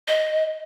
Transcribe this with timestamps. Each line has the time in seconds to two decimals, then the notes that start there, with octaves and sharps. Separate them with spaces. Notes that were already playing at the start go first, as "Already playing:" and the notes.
0.08 D#5